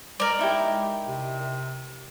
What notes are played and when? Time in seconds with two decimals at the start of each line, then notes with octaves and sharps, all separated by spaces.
0.20 G#3 A#4 D5
0.39 D#4 E4 G4
1.07 C3